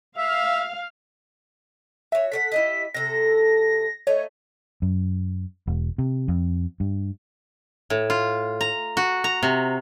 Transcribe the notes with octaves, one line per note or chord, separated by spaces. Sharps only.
E5 F5
F#4 C#5 E5
A4 C5 F#5 B6
E4 G4 D#5
C3 A4 A#6
A3 D#4 C#5
F#2
E1
C3
F2
G2
A2
F4
A#5
F#4
A#5
C3